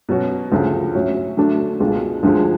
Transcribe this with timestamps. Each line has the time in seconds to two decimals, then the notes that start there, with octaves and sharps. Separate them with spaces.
0.09 B2 F#3 C#4 F#4
0.52 D2 C#3 F3
0.95 A2 F#3 C#4 F#4
1.37 D3 F#3 A3 D4 F#4
1.80 C#2 B2 G#3 D4 F4
2.23 D2 D3 F3 G#3